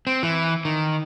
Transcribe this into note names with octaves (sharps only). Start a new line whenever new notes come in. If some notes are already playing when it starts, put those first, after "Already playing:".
C4
E3
D#3